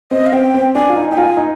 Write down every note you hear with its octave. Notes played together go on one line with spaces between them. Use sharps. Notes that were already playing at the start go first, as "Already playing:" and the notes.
C4 D#5
F5
C4 G5
C4
D4 G#5
F4
D#4
D#4 G5
F4 G#5
D#4